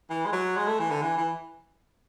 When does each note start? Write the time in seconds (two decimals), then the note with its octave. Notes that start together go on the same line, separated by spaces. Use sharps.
0.10 E3
0.25 G#3
0.32 F#3
0.57 G#3
0.67 A3
0.79 E3
0.90 D3
1.02 E3
1.17 E3